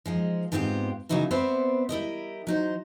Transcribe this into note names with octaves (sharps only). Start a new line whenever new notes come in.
F3 G#3 D#4
G#2 B3 C4 E4 F4 G4
C#3 F#3 A#3 D#4 E4 F#4
B3 C4 B4 C5 D5 E5
G3 E4 A#4 D#5
F#3 D#4 C5